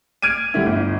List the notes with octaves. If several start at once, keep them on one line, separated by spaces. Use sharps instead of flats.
F6 G#6 D7 D#7
D3 G3 A3 E4
G1